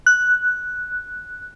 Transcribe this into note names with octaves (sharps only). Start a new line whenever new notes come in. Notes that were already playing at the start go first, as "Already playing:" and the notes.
F#6